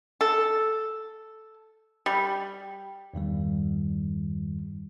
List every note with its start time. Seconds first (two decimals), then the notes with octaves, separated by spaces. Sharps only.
0.21 A4
2.06 G3
3.14 E2 G2 D#3 G3